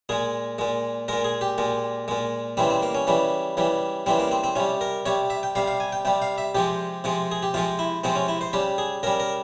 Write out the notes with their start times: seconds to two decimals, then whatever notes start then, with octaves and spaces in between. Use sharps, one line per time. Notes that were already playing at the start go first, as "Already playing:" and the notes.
0.09 A#2 G#3 G#4
0.58 A#2 G#3
1.08 A#2 G#3 A#4
1.24 G#4
1.41 G4
1.58 A#2 G#3
2.08 A#2 G#3
2.57 C#3 E3 G3 C4
2.70 C4
2.82 A#3
2.94 C#4
3.07 C#3 E3 G3
3.57 C#3 E3 G3
4.06 C#3 E3 G3 C4
4.19 A#3
4.31 C4
4.44 C4
4.55 C3 G3 C#4
4.81 A#4
5.06 C3 G3 C#5
5.30 E5
5.43 G5
5.55 C3 G3 F5
5.67 F5
5.80 G#5
5.92 G5
6.05 C3 G3 G5
6.22 F5
6.38 E5
6.55 C3 F3 G#3 G4
7.04 C3 F3 G#3
7.31 G#4
7.43 G4
7.54 C3 F3 G#3 F4
7.79 E4
8.04 C3 F3 G#3 C4
8.16 C#4
8.28 E4
8.41 C5
8.53 C#3 G3 G4
8.78 G#4
9.03 C#3 G3 A#4
9.20 A#4